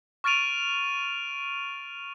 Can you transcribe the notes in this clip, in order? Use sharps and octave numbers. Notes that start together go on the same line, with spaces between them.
C#6 F6 A6 D7 D#7 F7